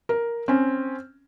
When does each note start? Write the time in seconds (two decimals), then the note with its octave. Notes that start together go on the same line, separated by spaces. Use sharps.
0.09 A#4
0.48 C4 C#4